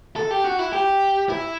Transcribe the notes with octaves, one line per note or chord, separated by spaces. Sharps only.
A4
G4
F#4
E4
G4
E4